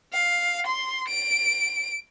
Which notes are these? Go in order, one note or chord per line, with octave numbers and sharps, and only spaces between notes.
F5
C6
D7